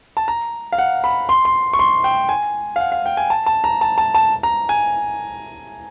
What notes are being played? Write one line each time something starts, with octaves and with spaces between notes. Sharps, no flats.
A5
A#5
F5
F#5
B5
C6
C6
C#6
C6
G5
G#5
F5
F#5
F5
G5
G#5
A5
A5
A#5
A5
A5
A5
A#5
G#5